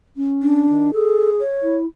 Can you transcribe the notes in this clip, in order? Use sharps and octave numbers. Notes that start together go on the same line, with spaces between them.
C#4
D4
D#3
G#4 A4
C#5
E4